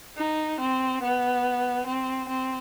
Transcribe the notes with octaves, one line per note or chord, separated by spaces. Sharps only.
D#4
C4
B3
C4
C4